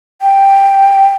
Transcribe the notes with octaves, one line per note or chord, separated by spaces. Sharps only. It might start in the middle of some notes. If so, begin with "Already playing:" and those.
G5